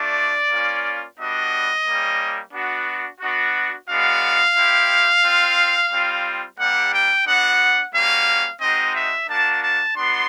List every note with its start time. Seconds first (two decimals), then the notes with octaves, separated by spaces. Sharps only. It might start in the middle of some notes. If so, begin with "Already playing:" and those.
Already playing: A3 D4 F4 D5
0.50 A#3 C#4 F4
1.18 G3 B3 D4 F#4 D#5
1.86 G3 A#3 C#4
2.53 B3 D4 F#4
3.20 B3 D4 F#4
3.88 G#3 B3 D4 F#4 F5
4.56 C4 E4 G4
5.23 C4 F4
5.91 G3 C4 F4
6.58 G3 A#3 D4 G4 F#5
6.92 G5
7.25 B3 D4 F#4 F#5
7.93 G3 A#3 C#4 F#4 F5
8.61 G#3 C4 D#4 F#4 D#5
8.95 E5
9.28 A#3 D4 F#4 A5
9.62 A5
9.96 B3 D4 F#4 C6